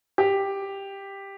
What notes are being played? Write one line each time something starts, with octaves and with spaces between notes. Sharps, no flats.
G4